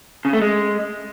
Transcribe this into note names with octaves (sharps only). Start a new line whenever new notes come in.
C#3
A3
G#3